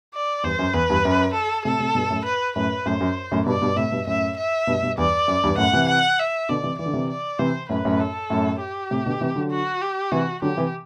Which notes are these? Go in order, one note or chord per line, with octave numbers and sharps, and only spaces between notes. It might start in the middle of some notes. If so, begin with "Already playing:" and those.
D5
E2 G2 C5
F#2
E2 B4
E2 G2
F#2
A4
A2 C3 A4
A2 C3
G2 B2
F#2 A2
B4
F#2 A2 B4
F#2 A2 C5
F#2
F#2 A2
G2 B2 D5
G2 B2
A2 C3 E5
G2 B2
F#2 A2 E5
E5
G2 B2
G2 B2
E2 G2 D5
F#2
E2 G2
F#2 A2 F#5
C3 E3
F#5
E5
B2 D3 D5
C3 E3
E3 D5
D3
C3 E3
D5
C3 E3 C5
F#2 A2 B4
F#2 A2
A4
F#2 A2
G4
A2 C3
B2 D3
C3 E3
D3 F#3
F#4
G4
C3 E3 F#4
D3 F#3 G4
C3 E3